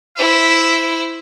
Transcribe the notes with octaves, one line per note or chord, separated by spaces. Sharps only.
E4 C5 E5